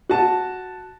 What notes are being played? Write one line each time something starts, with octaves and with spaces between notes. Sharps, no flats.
F#4 A5